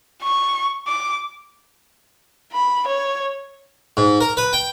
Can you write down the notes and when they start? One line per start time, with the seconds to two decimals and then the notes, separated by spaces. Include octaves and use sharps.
0.23 C#6
0.87 D6
2.52 B5
2.87 C#5
3.97 G#2
4.21 A#4
4.37 B4
4.53 G5